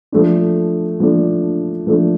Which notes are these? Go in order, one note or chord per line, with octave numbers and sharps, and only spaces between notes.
F3 A3 D4
F3 A3 D4
F3 A3 D4